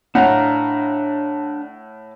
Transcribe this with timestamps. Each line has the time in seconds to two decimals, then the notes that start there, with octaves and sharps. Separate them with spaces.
0.15 A2 D4 F5 F#5 A#5